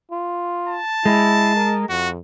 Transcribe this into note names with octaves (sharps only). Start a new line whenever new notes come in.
F4
A5
G#3 E4
A#4
F2 F#4